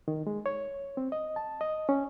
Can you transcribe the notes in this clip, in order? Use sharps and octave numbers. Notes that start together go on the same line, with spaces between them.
D#3
G#3
C#5
C4
D#5
A5
D#5
C#4